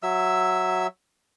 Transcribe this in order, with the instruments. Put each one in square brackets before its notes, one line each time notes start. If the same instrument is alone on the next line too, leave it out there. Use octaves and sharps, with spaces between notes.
[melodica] F#3 E5 E6